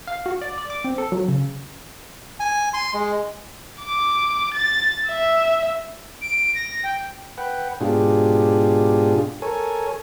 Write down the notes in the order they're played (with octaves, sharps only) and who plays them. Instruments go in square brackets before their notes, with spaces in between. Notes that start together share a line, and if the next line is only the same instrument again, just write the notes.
[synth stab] F5
F#4
D5
D5
D6
C4
A4
F#3
C#3
[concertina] G#5
C6
G#3
[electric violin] D6
A6
E5
[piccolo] D7
A#6
G5
[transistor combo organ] B4 F#5 G5
G#2 B2 D4 F4 G4 G#4
A4 A#4 C#5 G#5